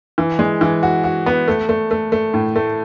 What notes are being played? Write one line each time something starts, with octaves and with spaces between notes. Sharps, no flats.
E3
G#3
E3
F#4
F#4
B3
A3
A3
A3
A3
A2
A3